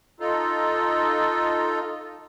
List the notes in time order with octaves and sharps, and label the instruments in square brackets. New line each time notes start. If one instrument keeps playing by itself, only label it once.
[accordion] D#4 F4 A4